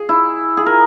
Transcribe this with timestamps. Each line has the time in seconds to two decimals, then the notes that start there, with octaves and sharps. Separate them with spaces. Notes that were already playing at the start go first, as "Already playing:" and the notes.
Already playing: G#4
0.09 E4
0.57 G#4
0.66 A#4